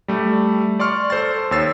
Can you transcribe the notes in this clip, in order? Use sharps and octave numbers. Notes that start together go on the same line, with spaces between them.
G3 A3
D5 C6 C#6 F6
A4 C5 C6 A6
D#2 C#5 E6 A6 C7